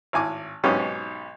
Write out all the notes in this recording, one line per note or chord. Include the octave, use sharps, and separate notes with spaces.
G#1 A2 G#5 D6
B1 G#2 B2 C#4 G4